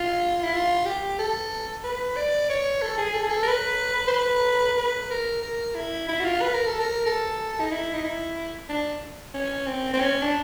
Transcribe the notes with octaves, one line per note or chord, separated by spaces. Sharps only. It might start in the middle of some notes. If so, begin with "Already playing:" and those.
Already playing: F4
E4
F4
G4
A4
B4
D5
C#5
A4
G#4
A4
G#4
A4
A#4
B4
C5
B4
B4
A#4
A#4
E4
E4
F#4
F4
B4
A#4
A4
A#4
A4
D#4
E4
D#4
E4
D4
C#4
C4
C4
C#4
D4